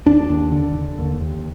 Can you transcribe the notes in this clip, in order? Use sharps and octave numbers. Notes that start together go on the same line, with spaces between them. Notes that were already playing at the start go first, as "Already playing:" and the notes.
D#2 D4
D#2
D3
D3
D#2
D#2